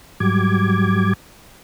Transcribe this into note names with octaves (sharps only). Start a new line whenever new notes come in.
G#2 F#3 G3 D6 G#6